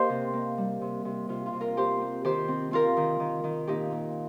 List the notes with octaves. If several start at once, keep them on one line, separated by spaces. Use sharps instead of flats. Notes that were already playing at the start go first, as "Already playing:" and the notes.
Already playing: A#3 G4 A#4 C5 D#5 F5
C3
A#3
G3
C3
C3
C3 F4
F4
C3
F4 A#4
C4 G4 C5
C4
D#3 G4 C5
C4
C4 F4 A#4
D#3
D#3
D#3
A#2 D#4 G4
A#2